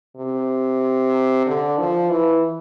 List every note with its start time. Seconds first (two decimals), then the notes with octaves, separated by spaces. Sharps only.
0.17 C3
1.46 D3
1.79 F3
2.10 E3